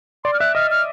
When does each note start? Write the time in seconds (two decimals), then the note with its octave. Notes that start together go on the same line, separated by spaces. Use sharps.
0.24 D5 C6
0.34 F6
0.40 E5 F#6
0.55 D#5 F6
0.71 F6